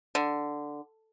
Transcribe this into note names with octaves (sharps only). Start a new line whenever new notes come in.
D3